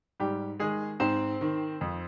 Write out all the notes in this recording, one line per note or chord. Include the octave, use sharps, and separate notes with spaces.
G#2 G3 G4
D#3 G#3 G#4
G#2 C4 C5
D#3
F2